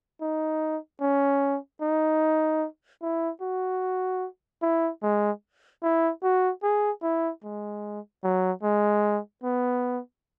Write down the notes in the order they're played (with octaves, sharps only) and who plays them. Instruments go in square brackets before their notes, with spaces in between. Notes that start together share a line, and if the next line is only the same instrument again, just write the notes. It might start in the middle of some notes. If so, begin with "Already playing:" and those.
[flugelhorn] D#4
C#4
D#4
E4
F#4
E4
G#3
E4
F#4
G#4
E4
G#3
F#3
G#3
B3